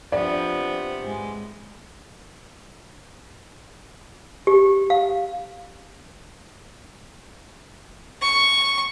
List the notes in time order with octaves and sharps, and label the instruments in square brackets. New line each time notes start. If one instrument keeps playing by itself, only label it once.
[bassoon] C3 [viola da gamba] F3 D4 [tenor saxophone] B3 [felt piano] D5
[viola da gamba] G#2 G#3
[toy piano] G4
F5
[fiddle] C#6